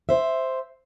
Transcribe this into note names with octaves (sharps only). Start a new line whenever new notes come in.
C5 E5